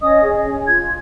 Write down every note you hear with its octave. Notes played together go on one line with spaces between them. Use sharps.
C#4 D#5 D#6
G#4
C#4
F4 G#6